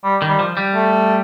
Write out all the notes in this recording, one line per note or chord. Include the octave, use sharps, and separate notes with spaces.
G3
D#3
G3
F3
G3
A3